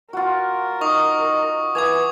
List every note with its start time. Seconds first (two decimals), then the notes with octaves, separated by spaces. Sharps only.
0.13 F4 F#4 A#4
0.81 D#4 C#6 D#6
1.75 E3 G#5 D6 D#6 G#6